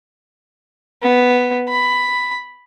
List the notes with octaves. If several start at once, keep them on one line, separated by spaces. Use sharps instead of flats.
B3
B5